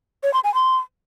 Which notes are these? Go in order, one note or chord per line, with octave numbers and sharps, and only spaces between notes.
C#5
C6
G#5
C6